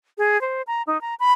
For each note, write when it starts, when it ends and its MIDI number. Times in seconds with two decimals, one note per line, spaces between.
0.18 0.40 68
0.41 0.62 72
0.67 0.82 82
0.87 1.00 63
1.01 1.15 82
1.20 1.32 83